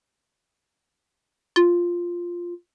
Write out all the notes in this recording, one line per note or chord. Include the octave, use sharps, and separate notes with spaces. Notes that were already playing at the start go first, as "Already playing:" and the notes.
F4